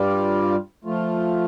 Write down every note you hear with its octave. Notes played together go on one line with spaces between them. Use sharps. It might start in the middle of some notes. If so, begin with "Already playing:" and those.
Already playing: G2 G3 F4 D5
F3 A3 F4